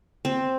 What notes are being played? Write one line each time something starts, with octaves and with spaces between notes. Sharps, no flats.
C4